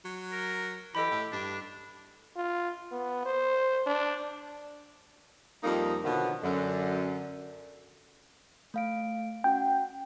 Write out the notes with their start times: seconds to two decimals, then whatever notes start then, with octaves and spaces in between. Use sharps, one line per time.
0.05 F#3
0.32 A#4
0.95 E3 G4 A4 D#5 B5
1.11 A2
1.32 G2 D4
2.36 F4
2.92 B3
3.25 C5
3.86 D4
5.64 F2 G3 A#3 D#4
6.04 B2 D3 D#3 F3 F#3 B3
6.43 F#2 D3
8.74 A3 F5 D7
9.44 C#4 F#4 F#5 G5